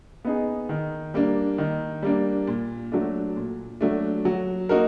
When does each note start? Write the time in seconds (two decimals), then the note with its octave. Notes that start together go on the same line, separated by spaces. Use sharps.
0.25 B3 D#4 G#4
0.69 D#3
1.14 G3 A#3 D4
1.58 D#3
2.02 G3 A#3 D4
2.47 A#2
2.92 F#3 A3 D4
3.36 A#2
3.81 F#3 A3 D4
4.25 F#3
4.69 A#3 D#4 F#4 A#4